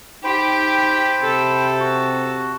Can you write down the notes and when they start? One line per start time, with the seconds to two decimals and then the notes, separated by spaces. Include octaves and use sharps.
0.24 D#4 G4 C5 G5 B5
1.21 C3 A4
1.79 F#4